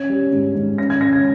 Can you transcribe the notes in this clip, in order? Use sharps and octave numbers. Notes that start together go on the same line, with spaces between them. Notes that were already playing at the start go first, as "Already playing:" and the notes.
Already playing: C#4 G#6
G3
G#2
G#2
C#4 A#6
G#6
C#4 A#6
G#6